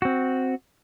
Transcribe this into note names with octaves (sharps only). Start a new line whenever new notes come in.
C4 F#4